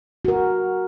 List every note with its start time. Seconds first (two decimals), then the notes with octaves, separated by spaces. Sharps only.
0.25 F#4 A#4